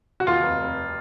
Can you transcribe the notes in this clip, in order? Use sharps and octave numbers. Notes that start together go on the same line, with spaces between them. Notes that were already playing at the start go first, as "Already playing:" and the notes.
F#4
D#2 F4
F1
F1